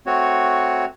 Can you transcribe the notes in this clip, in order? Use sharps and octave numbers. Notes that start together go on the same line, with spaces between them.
A3 C4 F#4 C#5